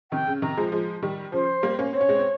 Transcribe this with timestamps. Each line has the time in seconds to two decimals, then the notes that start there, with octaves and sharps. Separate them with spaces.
0.12 C3 D#3 G5
0.27 C#3
0.42 C3 D#3 A#5
0.57 F3 G#3
0.72 F3 G#3
1.03 D#3 G3
1.32 C#3 F3 C5
1.63 G3 A#3
1.79 A#3 C#4
1.93 C4 C#5
2.01 C#4
2.09 G#3 C4
2.19 C4